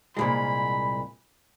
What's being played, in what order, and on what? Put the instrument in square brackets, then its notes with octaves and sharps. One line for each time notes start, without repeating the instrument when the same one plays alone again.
[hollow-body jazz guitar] C2 A#2 G#3 [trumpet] B5